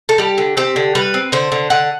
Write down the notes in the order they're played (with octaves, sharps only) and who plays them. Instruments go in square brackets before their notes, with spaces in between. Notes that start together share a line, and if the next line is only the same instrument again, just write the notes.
[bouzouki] A4
G3 G4
D3
C4 G4
D3
G3 B4
C4
D3 C5
D3
D3 F#5